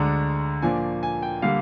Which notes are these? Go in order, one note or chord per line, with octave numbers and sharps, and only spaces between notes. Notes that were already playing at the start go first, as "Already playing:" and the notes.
Already playing: D2 D3 G#3 D4 A#5
A#2 F3 A#3 D4 G#5
G#5
G5
D3 G3 A#3 F5